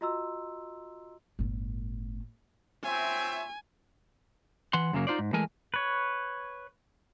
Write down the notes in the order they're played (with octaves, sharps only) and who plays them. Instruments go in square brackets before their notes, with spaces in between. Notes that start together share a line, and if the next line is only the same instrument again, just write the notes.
[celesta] F4 F#4 D#5 A#5 C6 E6
[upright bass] G1 A2
[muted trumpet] C4 [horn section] F4 C#5 E5 [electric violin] G#5
[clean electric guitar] E3 F#5 C6
F#2 C#3 F#3 A#3
D#4 F4 C5 D5
G#2
E3 G#3 A3 A#4 G#5
[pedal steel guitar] B4 C#5